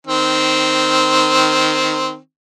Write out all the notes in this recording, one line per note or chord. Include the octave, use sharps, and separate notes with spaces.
D#3 C4